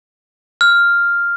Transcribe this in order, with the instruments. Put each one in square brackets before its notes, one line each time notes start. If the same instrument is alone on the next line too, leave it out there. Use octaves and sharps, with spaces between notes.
[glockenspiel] F6